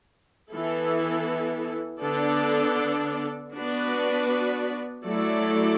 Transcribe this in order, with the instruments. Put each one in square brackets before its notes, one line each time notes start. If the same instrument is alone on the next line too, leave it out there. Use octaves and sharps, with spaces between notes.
[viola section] E3 B3 E4 A4
D3 B3 D4 A4 D5
B3 D4 F#4 B4 D5
F#3 A3 E4 A4 D5